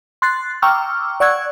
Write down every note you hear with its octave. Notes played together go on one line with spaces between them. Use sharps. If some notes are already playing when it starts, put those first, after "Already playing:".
C6 F#6 A6 C7
G5 A#5 C#6 D6 E6 F6
D5 F#5 C#6 E6 F#6 G#6